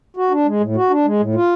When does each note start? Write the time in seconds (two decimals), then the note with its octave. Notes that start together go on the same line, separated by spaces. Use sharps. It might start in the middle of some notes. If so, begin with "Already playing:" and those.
0.17 F#4
0.31 D4
0.46 G#3
0.60 A2
0.76 F#4
0.90 D4
1.05 G#3
1.19 A2
1.35 F4